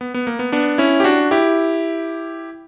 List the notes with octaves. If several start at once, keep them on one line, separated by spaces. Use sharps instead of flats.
B3
B3
A#3
B3
B3 D4
C#4 E4
G4
D4 F#4
E4 G4